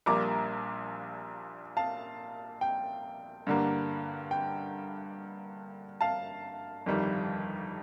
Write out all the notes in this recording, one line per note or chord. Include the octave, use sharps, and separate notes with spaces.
A#1 A#2 G3 A#3 A#5 D6
F5 A5
G5
G2 D3 G3 A#3
G5
F5 A5
G1 F2 D#3 G3